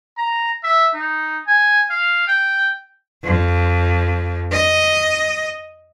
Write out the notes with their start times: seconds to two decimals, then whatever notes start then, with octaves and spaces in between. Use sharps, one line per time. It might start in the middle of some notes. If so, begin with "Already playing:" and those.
0.18 A#5
0.64 E5
0.94 D#4
1.47 G#5
1.90 F5
2.27 G5
3.24 F2
4.52 D#5